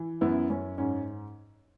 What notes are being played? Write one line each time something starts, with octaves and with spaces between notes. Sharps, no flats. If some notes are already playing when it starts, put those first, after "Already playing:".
Already playing: E3
F#2 B3 E4
F#2 C#4
G#2 C#4